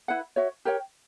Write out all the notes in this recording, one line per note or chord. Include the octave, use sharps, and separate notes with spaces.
E4 B4 F#5
F#4 C#5 E5
G4 A#4 C#5 G5